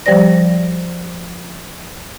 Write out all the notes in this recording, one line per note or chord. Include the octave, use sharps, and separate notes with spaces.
F3 G3 G4 C5 D5 A#6